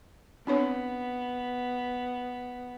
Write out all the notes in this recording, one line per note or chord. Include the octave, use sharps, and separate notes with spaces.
B3 C4 D4 C#5